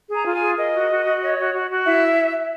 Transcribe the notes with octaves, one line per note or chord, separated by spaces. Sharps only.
G#4
A#5
F4
G#5
G#4
A#4 D#5
F#4
F#4
F#4
C#5
F#4
F#4
F#4
E4 E5